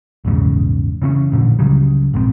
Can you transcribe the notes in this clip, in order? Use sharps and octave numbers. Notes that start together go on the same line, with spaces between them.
A#1 E2 G#2 C#3
C#3 E3 C4 C#4
A1 A#2 D3 F3
C#2 C#3 F#3 G3
A#1 G#2 B2 C4